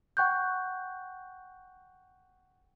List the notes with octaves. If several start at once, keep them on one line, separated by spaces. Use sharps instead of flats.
F#5 G5 C#6 F#6 G6